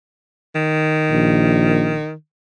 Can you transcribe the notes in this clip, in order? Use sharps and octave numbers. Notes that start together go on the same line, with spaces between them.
D#3
A#1